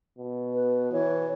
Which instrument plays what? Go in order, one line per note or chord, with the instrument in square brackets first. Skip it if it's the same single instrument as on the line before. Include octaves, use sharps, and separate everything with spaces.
[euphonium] B2
[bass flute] B4
[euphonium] E3 [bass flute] C#5